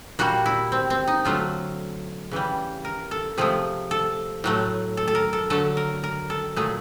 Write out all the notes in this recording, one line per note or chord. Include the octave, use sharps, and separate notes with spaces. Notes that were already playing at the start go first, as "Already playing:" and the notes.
A#2 G3 F#4
E4
C4
C4
D#4
D3 F#3 A3 F4
C#3 E3 G3
A#4
A4
C3 F3 A3 G#4
A4
A2 F#3 A3
A4
A4
A#4
A4
D3 F#3 A3 A4
A#4
A#4
A4
A#2 F#3 A3 G#4